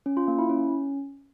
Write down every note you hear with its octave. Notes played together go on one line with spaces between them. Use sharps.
C#4
F4
A#3
E4
C#4